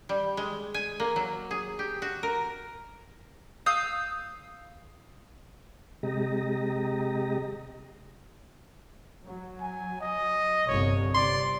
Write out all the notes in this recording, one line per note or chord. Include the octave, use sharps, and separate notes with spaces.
G3
G#3
G#5
A#3
F#3
G#4
G4
F#4
A#4
F5 D#6 E6 G6
C3 G#3 G4 D#5 A#5
F#3
G#5
D#5
G1 C2 C#5
C3 D5 C6